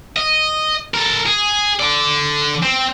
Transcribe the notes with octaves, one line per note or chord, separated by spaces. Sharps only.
D#5
A4 A#4
G#4
D3 D5
C4